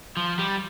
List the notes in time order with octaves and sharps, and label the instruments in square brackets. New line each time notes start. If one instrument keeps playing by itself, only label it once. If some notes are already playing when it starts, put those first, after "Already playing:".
[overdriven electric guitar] F3
G3